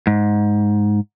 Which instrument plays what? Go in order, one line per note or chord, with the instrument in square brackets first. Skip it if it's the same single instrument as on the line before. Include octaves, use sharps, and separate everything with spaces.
[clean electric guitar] G#2